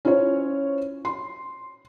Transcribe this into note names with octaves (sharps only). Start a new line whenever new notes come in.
C#4 E4 F4 C5 C#5
C6